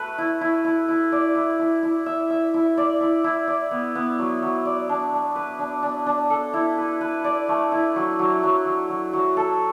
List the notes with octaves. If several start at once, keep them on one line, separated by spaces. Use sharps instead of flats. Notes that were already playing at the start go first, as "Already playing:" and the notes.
Already playing: A3 F#4 B4
E4
E4
E4
E4
D5
E4
E4
E4
E5
E5
E4
D5
E4
E4
D5
B3
B3
F#3
F#3
D5
D4
D4
B4
D4
D4
D4
A4
E4
B4
B4
D5
A3
E4
F#3
F#3
F#3
F#3
F#3
F#3
A4